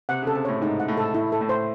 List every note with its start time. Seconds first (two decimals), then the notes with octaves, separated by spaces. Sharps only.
0.09 C3 F#5
0.22 C#3 A4
0.35 C3
0.45 A2 C#5
0.62 G#2 D#4
0.80 F#5
0.88 A2
0.97 A4
1.14 A2 E4
1.32 A4
1.41 A2
1.49 C5